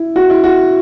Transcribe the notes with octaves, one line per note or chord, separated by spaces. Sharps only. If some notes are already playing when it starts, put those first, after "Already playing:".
Already playing: E4
F#4
E4
F#4